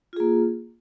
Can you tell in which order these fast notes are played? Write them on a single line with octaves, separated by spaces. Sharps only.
F4 G#4 A#3